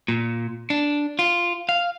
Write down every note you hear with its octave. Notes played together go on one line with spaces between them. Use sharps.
A#2
D4
F4
F5